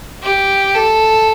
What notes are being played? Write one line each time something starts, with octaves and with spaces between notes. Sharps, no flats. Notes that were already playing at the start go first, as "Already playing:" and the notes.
G4
A4